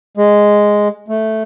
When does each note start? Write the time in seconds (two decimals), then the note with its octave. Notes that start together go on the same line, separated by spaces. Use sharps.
0.17 G#3
1.08 A3